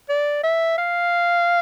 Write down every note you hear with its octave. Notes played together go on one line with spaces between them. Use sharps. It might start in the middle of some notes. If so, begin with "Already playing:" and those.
D5
E5
F5